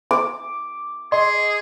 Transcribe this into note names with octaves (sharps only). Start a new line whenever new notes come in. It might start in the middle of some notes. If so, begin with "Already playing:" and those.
D6
G#4 D#5 C6